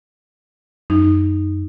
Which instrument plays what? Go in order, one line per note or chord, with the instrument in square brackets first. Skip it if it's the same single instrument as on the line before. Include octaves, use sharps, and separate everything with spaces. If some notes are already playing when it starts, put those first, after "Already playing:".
[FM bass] F#2 [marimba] D#4